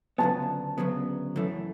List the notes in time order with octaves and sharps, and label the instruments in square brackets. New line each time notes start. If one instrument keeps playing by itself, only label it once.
[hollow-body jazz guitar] D2 C#3 F#3 B3 [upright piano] A5
[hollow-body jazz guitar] D2 C#3 F#3 B3
F#2 E3 A3